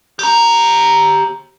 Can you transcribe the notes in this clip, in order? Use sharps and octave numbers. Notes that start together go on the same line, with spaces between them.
G4 A#5